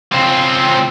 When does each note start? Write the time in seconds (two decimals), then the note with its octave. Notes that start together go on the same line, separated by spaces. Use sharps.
0.12 C#2 C4